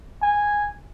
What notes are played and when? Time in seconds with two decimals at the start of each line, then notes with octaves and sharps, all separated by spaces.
0.22 G#5